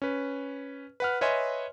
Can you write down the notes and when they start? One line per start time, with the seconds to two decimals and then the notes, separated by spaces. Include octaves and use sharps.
0.02 C#4 B4
1.00 B4 F#5 F6
1.21 B4 C#5 D#5 E5 G#5 C6